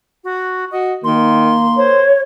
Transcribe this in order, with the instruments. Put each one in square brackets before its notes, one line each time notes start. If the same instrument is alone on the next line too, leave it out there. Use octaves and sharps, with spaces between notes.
[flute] F#4
[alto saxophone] F#4 [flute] D#5
[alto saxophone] D#3 [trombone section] A#3 [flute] C6
[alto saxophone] C5 [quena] C#5